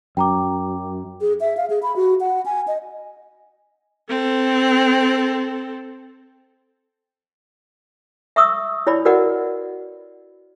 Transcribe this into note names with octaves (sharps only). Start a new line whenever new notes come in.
F#2 G5 A#5 D6
G#4
E5
F5
G#4
B5
F#4
F#5
G#5
D#5
C4 A4
E5 C#6 D#6 E6
E4 C#5 D5 B5
F#4 A#4 B4 D5 D#5 F#5